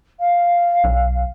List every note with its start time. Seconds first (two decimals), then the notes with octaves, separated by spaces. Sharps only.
0.20 F5
0.84 B1